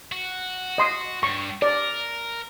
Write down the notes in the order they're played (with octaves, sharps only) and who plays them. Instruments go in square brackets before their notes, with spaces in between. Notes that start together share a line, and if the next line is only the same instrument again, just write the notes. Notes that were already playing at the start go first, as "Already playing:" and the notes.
[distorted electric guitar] F#4
[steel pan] D#5 C6 D#6
[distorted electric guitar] G2 [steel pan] C#6
[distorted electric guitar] A#4 [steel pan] D5